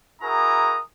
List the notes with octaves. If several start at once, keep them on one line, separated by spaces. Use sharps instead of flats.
E4 F#4 G#4 A#4 A#5 D#6